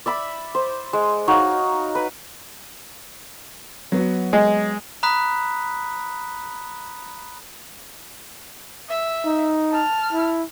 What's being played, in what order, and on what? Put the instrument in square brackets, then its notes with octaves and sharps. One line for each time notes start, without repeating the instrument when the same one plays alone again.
[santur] D5 E5 B5
C5
G#3
D#4 F#4 C#5 F5
B4
[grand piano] F#3 B3 F#4
[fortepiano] G#3
[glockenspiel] A#5 B5 D#6 F#6 B6
[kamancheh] E5
[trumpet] D#4
[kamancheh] A5 F6
[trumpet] E4